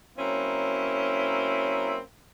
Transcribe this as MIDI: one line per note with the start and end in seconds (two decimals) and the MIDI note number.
0.18 1.99 54
0.18 1.99 58
0.18 1.99 60
0.18 1.99 61
0.18 1.99 64